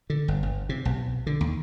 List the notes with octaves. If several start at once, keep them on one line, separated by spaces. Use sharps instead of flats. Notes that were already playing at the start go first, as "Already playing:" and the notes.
D3
G1
G1
C3
B1
D3
D#2